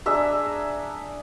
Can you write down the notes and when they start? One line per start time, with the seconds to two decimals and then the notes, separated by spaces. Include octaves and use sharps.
0.06 D4 G#4 E5 A#5